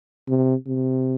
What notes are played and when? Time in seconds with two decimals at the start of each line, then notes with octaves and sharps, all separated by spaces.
0.28 C3
0.67 C3